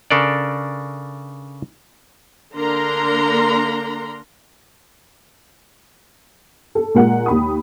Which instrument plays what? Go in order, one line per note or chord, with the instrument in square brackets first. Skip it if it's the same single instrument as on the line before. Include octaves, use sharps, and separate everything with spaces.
[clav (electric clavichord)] C#3 D4 A4 A#4 D5
[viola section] D3 A#3 D4 A#4 A#5 C6
[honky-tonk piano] A4
A#2 G#3 A#4 F#5
D#2 B5 D#6